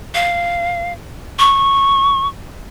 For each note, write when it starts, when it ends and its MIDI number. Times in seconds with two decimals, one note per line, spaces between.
0.15 0.93 77
1.39 2.27 85